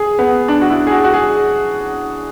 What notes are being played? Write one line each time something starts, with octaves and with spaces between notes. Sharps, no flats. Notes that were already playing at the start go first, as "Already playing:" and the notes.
Already playing: G#4
B3
D4
F#4
E4
G#4
F#4
F#4
G#4